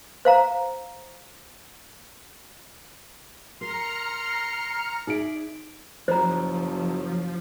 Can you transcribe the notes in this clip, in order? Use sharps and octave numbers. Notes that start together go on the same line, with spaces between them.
C5 F5 A#5
A#4 A#5 C6 F6 C#7
D#4 G#4 D5 E5 D7
F#1 F3 F#3 C5 A#5